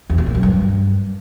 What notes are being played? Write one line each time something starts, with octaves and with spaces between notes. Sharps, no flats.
E2
A2
A#2
F#2
G2